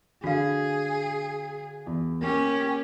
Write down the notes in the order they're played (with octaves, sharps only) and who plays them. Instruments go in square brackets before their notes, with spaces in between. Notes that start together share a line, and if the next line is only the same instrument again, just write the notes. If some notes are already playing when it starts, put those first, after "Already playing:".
[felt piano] D3 [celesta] F#4 F5 [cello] G#4
[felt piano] E2
[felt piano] A#3 [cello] C#4 G4